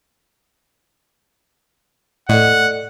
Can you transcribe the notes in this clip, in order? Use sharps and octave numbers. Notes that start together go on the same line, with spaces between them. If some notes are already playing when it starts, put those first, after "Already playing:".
A2 A4 D5 D#5 F#5